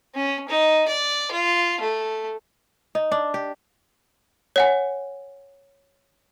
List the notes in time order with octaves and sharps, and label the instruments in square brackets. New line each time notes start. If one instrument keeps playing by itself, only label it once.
[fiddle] C#4
D#4
D5
F4
A3
[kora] D#4
D4
G4
[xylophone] C#5 F#5 G#5